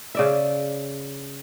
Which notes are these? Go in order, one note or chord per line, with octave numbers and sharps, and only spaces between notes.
C#3 D5 E5